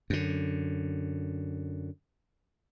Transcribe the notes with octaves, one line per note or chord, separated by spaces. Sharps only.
F#2 D3